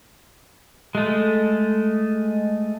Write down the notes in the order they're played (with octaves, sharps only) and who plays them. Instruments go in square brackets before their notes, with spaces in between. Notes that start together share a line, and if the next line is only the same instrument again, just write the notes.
[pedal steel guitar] G#3 A3